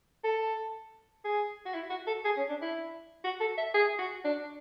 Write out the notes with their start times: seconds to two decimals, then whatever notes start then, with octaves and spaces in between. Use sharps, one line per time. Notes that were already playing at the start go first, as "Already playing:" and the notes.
0.24 A4
1.25 G#4
1.65 F#4
1.74 E4
1.90 F#4
2.07 A4
2.25 G#4
2.37 C#4
2.49 D4
2.62 E4
3.24 F#4
3.41 A4
3.58 E5
3.74 G#4
3.99 F#4
4.24 D4